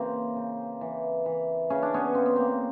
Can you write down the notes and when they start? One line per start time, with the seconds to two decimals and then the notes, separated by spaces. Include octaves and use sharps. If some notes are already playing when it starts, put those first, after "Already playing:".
Already playing: C#3 E3 A#3 C4
0.36 C#3
0.81 E3
1.26 E3
1.70 C#3 C#4
1.82 D4
1.94 B3 C#4
2.15 C#3 C4
2.26 B3
2.36 A#3 C4